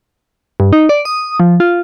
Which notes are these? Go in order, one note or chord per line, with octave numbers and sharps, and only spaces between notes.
G2
D#4
D5
D#6
F3
F4